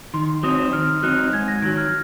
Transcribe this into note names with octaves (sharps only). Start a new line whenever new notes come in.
D#3 C6
F#3 C4 D#4 D#6
D#3 F6
F#3 C4 D#4 F#6
G#2 G#6
A#6
F#6
D#3 F#3 G#6
F6